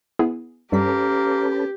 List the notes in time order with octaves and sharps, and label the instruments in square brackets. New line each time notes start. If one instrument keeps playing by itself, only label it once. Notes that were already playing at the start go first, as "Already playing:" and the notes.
[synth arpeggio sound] B3 E4 G#4
[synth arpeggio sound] G2 G3 B6 [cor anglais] A#3 [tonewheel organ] C#4 A4 B4 [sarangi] G4